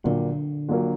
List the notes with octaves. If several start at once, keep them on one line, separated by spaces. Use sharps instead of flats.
A#1 A#2 D3 F#3 A#3
A#1 A#2 F#3 A#3